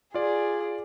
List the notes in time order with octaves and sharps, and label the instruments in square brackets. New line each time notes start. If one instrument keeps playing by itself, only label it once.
[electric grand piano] F4 D5 [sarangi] G#4